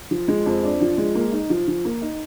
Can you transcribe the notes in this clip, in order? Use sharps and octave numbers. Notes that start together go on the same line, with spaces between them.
F3
G#3
F2
D4
F3
G#3
A#3
D#4
F3
F3
A#3
D#4